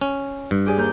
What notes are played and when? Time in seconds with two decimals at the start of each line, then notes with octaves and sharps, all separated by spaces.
0.01 C#4
0.51 G2
0.66 G4 G#4 D5
0.77 D#2 A#4 G6